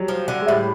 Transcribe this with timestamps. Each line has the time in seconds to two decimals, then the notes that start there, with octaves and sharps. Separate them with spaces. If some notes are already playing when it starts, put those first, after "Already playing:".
Already playing: F#3 G3
0.08 F3
0.28 D3
0.41 G#3
0.48 A2 G3